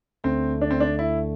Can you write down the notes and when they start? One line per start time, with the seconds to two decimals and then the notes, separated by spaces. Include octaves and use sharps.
0.24 D2 D3 A3 C4
0.61 D4
0.71 C4
0.80 D4
0.99 E4